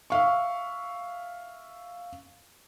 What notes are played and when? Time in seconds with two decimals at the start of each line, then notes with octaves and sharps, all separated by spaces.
0.10 E5 F5 C#6